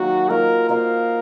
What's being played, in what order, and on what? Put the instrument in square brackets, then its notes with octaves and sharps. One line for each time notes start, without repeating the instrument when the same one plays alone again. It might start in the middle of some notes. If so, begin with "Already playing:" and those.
Already playing: [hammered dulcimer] D#3 F#3 A#3 [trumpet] F#4
[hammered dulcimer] A#3 F4 C5 D#5 [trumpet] A#4
[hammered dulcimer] A#3 F4 C5 D#5 [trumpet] A#4